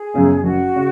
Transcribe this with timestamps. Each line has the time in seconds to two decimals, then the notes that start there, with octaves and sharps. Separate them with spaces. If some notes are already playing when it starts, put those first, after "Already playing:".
Already playing: G#4
0.14 F#2 C#3 B3
0.43 F#1 F#4
0.76 C#3